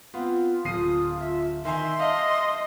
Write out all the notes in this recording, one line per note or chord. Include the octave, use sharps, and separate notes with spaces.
B3 C4 F4
D1 D#6 C7 D#7
E5
D#3 E5 G#5 A#5 C6
D#5 F5 A5